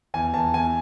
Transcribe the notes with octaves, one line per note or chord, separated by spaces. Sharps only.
E2 G#5
E2 A5
E2 G#5